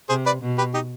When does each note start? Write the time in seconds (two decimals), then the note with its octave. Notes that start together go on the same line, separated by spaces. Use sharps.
0.09 C3 G#4 C5
0.26 B4 D5
0.42 B2
0.58 G4 B4
0.74 D#4 G4